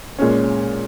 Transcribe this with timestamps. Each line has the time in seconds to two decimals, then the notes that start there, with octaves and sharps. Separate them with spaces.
0.19 A#2 G#3 C#4